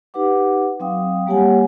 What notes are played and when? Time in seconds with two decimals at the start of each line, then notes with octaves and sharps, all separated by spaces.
0.14 D#4 G4 B4 F#5 D6
0.80 F#3 C4 F5 G5 D#6
1.27 G3 A#3 G4 C#5 F#5 G#5